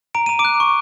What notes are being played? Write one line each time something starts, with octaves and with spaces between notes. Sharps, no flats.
A#5 D7
A#5 D#7
D6 D7
F#6
C#6